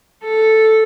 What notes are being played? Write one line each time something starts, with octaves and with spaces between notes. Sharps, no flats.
A4